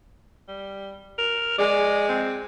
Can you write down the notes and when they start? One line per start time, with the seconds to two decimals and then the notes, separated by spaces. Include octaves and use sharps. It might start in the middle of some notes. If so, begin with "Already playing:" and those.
0.48 G3
1.19 A#4
1.59 G#3 D5
2.09 C4